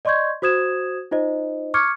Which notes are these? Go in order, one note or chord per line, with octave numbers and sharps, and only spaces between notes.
D5 D#5 C6 C#6 G6 G#6
F#4 C5 D#6 G#6 E7
D#4 F4 C5 D#5
C#6 D6 F6 G#6 C#7